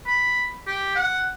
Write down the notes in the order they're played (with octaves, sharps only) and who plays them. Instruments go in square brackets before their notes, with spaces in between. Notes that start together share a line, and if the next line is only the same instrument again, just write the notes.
[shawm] B5
G4
F#5